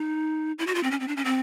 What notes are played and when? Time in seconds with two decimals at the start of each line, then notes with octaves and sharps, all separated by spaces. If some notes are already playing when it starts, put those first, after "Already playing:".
Already playing: D#4
0.59 E4
0.67 F#4
0.75 F4
0.83 C4
0.91 C#4
1.00 C4
1.08 D4
1.17 C#4
1.25 C4